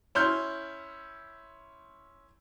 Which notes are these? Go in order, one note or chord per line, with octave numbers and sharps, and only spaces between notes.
C#4 E4 C6 F6 G6